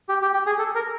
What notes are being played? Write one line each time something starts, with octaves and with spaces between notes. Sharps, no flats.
G4
G4
G4
G#4
A4
A#4